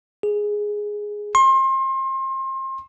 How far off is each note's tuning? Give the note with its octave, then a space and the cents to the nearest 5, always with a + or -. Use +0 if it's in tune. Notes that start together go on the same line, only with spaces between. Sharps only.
G#4 +0
C6 +30